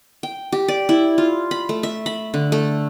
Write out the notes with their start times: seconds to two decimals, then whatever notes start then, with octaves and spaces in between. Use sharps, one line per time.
0.23 G5
0.52 G4
0.68 D5
0.89 E4
1.18 F4
1.51 B5
1.69 A3
1.83 E5
2.06 B5
2.34 D3
2.52 A3